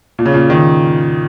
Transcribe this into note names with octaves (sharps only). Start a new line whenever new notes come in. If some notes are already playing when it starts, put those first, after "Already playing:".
A#2
C#3
A#2
D#3